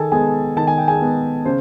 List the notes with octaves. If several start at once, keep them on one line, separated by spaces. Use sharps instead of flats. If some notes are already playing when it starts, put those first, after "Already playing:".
Already playing: D#3 G#4 A4 G#5 A5
G#3 B3 G#4 G#5
D#3 A5
G#5
G5
G#4 G#5
G#3 B3
C#3 C5